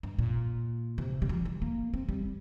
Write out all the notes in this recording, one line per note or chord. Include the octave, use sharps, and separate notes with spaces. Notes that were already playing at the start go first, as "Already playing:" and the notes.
G2
A#2
C3
G3
F3
G3
A#3
C4
G3